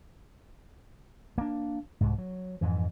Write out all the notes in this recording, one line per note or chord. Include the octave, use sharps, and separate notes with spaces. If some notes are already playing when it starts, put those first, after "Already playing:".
A#3 D4
C2 G#2
F#3
F2 G#2 E3